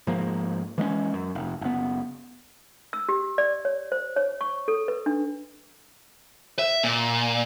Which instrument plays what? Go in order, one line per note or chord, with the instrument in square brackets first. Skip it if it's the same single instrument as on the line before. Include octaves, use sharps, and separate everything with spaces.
[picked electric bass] G#2 F3 A#3
E3 G#3 A3 C#4
F#2
F1
F#1 B3
[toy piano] E6
G4
D5
C#5
C5
C#5
C#6
A4
B4
D4
[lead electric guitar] E5
A#2